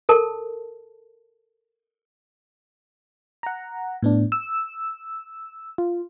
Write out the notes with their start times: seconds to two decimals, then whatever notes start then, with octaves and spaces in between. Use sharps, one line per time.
0.09 A4 A#4 A5
3.43 F#5 A#5
4.02 A2 B3 D4
4.32 E6
5.78 F4